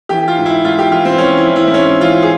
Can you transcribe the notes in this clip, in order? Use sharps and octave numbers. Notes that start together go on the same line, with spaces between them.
E3 G4
F4
G#2
E4
G#2 F4
G4
E3 F4
C4
E3 C#4
E4
E3
E4
C4
G#2 C#4
E3 F4
G#4